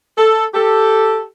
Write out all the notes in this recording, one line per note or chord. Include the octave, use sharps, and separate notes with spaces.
A4
G4 A4